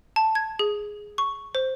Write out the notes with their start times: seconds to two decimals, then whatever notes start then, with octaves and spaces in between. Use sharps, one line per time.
0.16 A5
0.35 G#6
0.59 G#4
1.18 C#6
1.55 C5